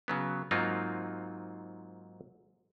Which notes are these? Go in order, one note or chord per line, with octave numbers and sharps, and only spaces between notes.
C#3 F#3 B3
G#2 F#3 A#3 C4 D#4 F4